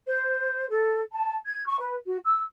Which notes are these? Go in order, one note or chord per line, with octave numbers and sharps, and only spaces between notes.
C5
A4
A5
G#6
C#6
B4
F#4
E6